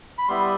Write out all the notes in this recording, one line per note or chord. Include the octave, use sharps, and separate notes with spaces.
B5
G3 B3 E4 C6